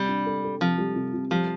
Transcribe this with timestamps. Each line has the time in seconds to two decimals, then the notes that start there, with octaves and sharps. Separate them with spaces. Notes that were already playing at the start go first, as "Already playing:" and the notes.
Already playing: C3 G3
0.08 D4
0.26 A4
0.44 A4
0.61 C3 F3
0.78 G3
0.96 C3
1.14 C3
1.31 F3 G3